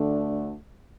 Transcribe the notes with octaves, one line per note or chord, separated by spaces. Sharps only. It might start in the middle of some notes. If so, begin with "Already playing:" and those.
Already playing: D2 D3 A3 D4